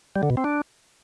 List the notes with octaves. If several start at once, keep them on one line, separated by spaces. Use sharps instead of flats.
G3
D3
B2
C4
D4